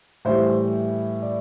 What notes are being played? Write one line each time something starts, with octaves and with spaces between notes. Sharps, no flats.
A2 E3 G3 C5
D5